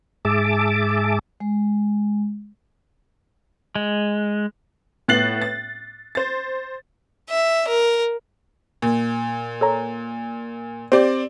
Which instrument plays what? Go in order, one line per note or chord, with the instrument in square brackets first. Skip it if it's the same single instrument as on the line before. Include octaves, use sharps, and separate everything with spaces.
[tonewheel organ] G#2 G#4 E5 A5 D6
[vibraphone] G#3
[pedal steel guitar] G#3
[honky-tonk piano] A2 B3 F#6 A6 C7 F#7
A6
C5 A6
[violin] E5
A#4
[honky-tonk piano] A#2
[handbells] A4 C#5 A#5
[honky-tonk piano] C4 D5 [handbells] G4 C5